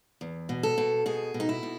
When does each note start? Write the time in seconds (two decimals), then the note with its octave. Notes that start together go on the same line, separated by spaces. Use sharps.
0.21 E2
0.49 B2
0.63 A4
0.78 B2
1.06 B2 G#4
1.34 B2
1.40 D#4
1.49 E4
1.63 B2